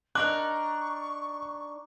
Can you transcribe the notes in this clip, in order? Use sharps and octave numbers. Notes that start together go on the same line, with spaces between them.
D4 D#4 A#4 C#6 D6 F#6